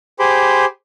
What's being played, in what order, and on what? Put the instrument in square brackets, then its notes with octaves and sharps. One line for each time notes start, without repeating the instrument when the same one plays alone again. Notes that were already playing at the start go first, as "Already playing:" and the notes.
[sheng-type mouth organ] G4 G#4 C5 B5 C6 D6